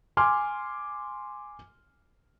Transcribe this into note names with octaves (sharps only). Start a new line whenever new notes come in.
G#5 C6 D6 F6